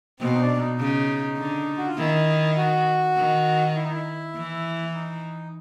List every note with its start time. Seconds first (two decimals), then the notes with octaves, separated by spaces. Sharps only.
0.20 B2 C4
0.35 D#4
0.40 D4
0.60 D#4
0.80 C#3
1.38 D3
1.78 F#4
1.87 F4
1.97 D#3 E4
2.57 F#4
3.17 D#3
3.76 E4
3.83 D#4
3.91 E4
4.36 E3
4.94 D#4